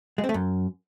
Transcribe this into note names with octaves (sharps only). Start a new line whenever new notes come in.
G#3
C4
A3
F#2